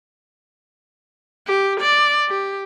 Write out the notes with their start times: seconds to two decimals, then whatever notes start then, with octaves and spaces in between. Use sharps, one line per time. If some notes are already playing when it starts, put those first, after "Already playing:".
1.47 G4
1.81 D5
2.29 G4